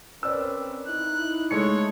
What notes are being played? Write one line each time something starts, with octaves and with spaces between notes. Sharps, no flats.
C4 C#4 A#4 B4 D5 E6
D#4 E4 F#6
G#3 A3 C#5 C#7